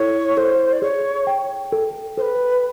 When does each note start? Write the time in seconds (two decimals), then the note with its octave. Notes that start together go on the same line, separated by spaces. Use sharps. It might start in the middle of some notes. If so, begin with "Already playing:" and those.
Already playing: E4 A4 C#5
0.37 A4 C5
0.73 D5
0.82 G#4 C#5
1.27 G5
1.73 A4
2.18 A4 C5
2.22 B4